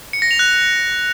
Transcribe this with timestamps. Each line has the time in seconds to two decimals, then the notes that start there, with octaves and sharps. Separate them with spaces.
0.13 C#7
0.22 A#6
0.31 F7
0.39 F#6